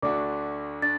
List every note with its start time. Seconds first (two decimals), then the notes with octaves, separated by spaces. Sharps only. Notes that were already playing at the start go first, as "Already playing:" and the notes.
0.02 D2 D3 A3 D4 F#4 D5 D6
0.82 D4 A6